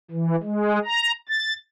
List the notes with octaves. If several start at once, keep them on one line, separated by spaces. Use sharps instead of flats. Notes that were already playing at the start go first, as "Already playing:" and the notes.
E3
G#3
A#5
A6